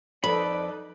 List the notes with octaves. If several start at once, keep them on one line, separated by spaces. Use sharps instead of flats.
F2 D#4 A4 B4 D5 B5